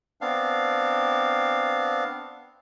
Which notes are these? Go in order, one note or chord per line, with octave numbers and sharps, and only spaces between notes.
B3 C4 D4 F5